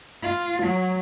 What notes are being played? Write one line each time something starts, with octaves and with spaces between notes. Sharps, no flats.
F4
F#3